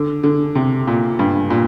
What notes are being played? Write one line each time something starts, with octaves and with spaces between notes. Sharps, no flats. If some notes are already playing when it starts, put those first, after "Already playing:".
Already playing: D3
D3
C3
A#2
G2
A#2